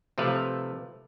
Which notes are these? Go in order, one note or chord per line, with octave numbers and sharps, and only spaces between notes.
C3 F3 A3 B4 F5